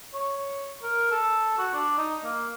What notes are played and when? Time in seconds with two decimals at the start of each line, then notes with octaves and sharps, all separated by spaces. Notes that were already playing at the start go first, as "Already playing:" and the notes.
0.14 C#5
0.83 A#4
1.11 A4
1.58 F#4
1.74 D4
1.98 D#4
2.24 A#3